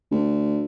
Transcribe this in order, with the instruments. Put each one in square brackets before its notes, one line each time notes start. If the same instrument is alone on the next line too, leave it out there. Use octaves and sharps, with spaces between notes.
[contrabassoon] D2